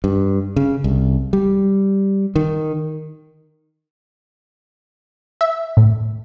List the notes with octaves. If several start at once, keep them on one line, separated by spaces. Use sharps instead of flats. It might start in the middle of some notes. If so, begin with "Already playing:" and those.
G2
C#3
C2
G3
D#3
E5
A2